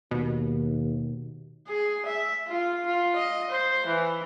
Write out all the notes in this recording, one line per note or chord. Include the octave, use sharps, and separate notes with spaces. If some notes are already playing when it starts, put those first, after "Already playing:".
D#2 B2
G#4
E5
F4
F4
D#5
C5
E3